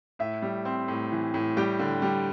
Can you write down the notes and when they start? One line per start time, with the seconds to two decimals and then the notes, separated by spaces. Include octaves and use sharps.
0.19 A2 E5
0.42 G3
0.65 C4
0.88 A2
1.12 E3
1.34 A2
1.57 G3 G4 G5
1.79 D3
2.02 G3